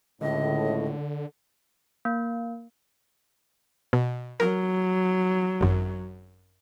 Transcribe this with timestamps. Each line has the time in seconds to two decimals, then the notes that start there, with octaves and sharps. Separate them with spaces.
0.21 C#2 A2 D3 D#5
2.05 A#3
3.93 B2
4.40 F#3 A#4
5.61 G#1 F#2